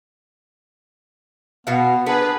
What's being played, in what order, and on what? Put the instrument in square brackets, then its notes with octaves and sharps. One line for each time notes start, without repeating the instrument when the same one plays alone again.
[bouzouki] B2 F#4 F5 [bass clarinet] B3
[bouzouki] B3 [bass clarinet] D4 [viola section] G#4 B4